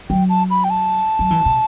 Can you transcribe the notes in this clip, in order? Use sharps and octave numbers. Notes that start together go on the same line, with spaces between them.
F#3 G5
A5
B5
G5
A5
F#3
E3
C3